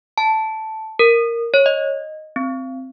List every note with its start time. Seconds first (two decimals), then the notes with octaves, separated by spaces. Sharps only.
0.18 A5
0.99 A#4
1.54 C#5
1.66 D#5
2.36 C4